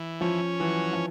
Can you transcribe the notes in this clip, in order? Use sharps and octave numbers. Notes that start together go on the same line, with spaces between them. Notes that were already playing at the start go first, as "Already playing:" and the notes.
Already playing: E3
F3 C#4
E3 F#3
F3